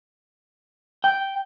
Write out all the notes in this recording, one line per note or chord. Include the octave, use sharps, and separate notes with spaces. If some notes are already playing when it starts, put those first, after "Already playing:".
G5